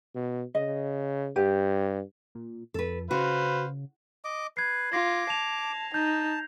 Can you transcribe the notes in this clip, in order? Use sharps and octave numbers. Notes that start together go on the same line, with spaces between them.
B2
C#3 D#5
G2 G4
A#2
F2 A4 B4
C#3 F#4 B4 C5 F5
D#5 D6
B4 G#6 C7
F4 D6 A#6
A5 F7
D#4 A5 G6